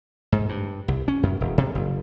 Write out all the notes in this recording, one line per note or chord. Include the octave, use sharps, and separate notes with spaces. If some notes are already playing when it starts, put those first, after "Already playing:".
G#2
G2
C2
C#4
F#2
E1
C3
F#1